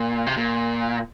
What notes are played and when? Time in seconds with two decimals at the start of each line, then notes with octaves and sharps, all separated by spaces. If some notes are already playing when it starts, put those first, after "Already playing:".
Already playing: A#2
0.26 C3
0.37 A#2